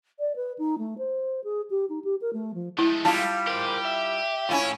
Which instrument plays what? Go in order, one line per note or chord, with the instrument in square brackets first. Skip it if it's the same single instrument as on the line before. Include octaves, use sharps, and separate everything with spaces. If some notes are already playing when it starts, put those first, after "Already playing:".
[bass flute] D5
B4
D#4
A3
C5
G#4
G4
D#4
G4
A#4
A3
F3
[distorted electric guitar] G#3 A3 [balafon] E4
[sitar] G3 E4 F4 [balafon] A5
[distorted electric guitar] G4 [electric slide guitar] A#4 C5
[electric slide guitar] E5
[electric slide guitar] A2 G#5 [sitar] C#4 E4 F4